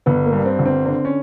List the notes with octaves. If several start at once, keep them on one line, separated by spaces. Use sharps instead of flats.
G1 B3
A#3
G2
C4
G1
C4
D3 C4
C#4